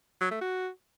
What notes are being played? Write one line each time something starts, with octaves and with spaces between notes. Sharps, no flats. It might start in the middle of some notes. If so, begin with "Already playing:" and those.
F#3
A3
F#4